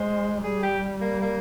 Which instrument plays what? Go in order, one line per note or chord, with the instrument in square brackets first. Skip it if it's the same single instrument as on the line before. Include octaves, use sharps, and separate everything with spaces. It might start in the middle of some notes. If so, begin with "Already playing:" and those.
Already playing: [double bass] G#3 [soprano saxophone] C5
[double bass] G3 [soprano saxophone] G#4
[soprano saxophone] G4
A#3
A#3